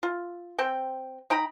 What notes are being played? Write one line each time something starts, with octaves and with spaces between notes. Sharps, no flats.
F4
C4 G5
D#4 G5 A#5 B5